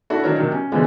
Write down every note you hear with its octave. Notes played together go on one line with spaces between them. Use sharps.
D4 E4 F#4 A4
D#3 F#3 D4 A#4 C#5
C3 D#3 F#3
C#4
B2 D3 E3 F3 G#3